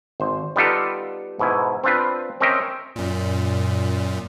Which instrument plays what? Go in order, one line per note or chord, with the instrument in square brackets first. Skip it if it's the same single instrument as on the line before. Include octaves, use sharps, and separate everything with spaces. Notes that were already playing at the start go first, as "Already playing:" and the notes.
[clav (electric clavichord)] G#1 C5
G3 B3 D#4 F4 G4 A4
G#2 B2 E4 G#5
C4 D4 F4 B4
C4 C#4 A#4 D#5 E5 G5
[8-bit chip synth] F#2 A#2